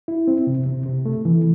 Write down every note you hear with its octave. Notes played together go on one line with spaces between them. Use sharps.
E4
C4
C3
C3
C3
A3
E3